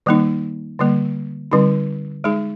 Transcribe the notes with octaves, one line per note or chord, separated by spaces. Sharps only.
D#3 G3 A#3 D#4
D3 G3 A#3
D3 G3 C4 D#4
G#3 D#4 G#4